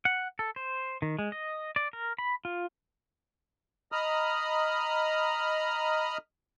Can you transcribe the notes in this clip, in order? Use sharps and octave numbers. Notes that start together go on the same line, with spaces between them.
F#5
A4
C5
D#3
G#3
D#5
D5
A#4
B5
F4
D#5 A#5 B5 D#6 F6